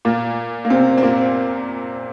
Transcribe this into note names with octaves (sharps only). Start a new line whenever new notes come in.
A#2 A#3
A#3
C3 C4
C4
A#2 A#3